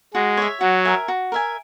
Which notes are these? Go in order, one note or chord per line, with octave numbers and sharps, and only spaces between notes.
G#3 F#4
C#5 E5
F#3 F#4
A#4 E5 G#5
F#4
A#4 E5 G#5